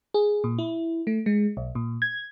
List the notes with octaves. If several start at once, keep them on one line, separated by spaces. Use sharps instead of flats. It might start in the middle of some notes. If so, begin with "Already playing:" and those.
G#4
A#2
E4
A3
G#3
B1
A#2
G#6